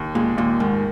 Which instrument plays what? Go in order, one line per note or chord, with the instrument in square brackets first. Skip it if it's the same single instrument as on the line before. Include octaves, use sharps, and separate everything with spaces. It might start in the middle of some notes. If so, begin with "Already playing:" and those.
Already playing: [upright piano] D#2
[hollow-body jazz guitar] A#2 [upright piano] G#3
[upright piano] D#2 [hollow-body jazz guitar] A#2
[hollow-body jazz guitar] G#2 [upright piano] D#3